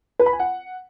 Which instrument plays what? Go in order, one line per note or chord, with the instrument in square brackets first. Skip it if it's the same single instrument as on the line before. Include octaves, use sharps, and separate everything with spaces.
[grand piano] B4
B5
G#5
F#5